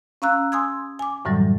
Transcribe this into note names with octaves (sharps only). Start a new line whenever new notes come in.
C#4 F5 A#5 E6 F#6
G#5 C6 D#6 E6 G#6
G#5 D6
F#2 A2 D3 E3 F#3 G3